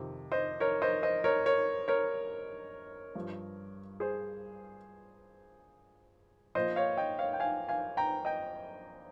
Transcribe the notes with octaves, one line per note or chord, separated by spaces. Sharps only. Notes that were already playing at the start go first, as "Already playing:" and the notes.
Already playing: F2 C3 D#3
C5 D#5
A#4 C#5
C5 D#5
C5 D#5
A#4 C#5
A#4 C#5
A#4 C#5
G2 F3
G#4 C5
A#2 F3 C5 D#5
C#5 F5
D#5 G5
C#5 F5
G5
F5 G#5
F5 G#5
G5 A#5
D#5 G5